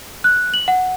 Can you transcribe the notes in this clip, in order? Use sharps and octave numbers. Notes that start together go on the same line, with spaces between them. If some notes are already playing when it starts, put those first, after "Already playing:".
F#6
F#7
F#5